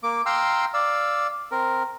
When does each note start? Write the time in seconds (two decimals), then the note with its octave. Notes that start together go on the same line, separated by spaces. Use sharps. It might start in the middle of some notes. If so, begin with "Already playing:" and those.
0.03 A#3 D6
0.26 F5 G5 A#5 C6 E6
0.74 D5 F5 E6
1.52 C4 A#4